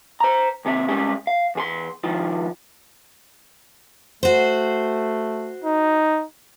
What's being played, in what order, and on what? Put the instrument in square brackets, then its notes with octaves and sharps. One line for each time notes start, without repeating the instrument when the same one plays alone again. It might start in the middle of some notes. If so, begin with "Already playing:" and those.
[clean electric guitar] C5 A#5
D#2 C3 A4 E5
G3 G#3 C#4 G4
F5
E2 G#4 C6
C#2 D#3 F3
[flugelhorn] A3 [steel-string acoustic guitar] F#4 C5
[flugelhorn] D#4